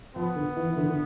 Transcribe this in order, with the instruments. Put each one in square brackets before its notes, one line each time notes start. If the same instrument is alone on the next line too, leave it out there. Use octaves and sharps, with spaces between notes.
[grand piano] F3 [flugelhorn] B3
[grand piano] D3
E3
E3
D3
D3